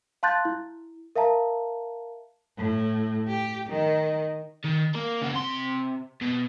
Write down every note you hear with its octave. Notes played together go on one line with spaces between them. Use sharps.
F5 A5 C6 F#6 G6 A6
E4
A#4 E5 F5 A5 A#5
A2
G4
D#3
D#3
A#3 A#4
C#3 F#4
C3 C6
B2